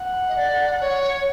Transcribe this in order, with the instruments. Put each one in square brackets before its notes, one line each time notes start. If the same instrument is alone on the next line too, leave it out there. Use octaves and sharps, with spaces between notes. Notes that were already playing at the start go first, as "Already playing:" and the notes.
Already playing: [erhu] F#5
[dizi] D#5
D5
C#5